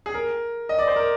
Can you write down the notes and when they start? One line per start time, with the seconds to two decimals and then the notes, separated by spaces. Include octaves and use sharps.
0.06 G#4
0.14 A#4
0.69 D#5
0.79 D5
0.87 C5
0.96 A#4